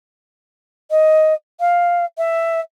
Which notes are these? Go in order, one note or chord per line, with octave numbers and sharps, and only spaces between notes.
D#5
F5
E5